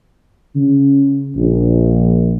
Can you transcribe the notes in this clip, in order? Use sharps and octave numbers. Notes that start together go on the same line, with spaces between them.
C#3
A#1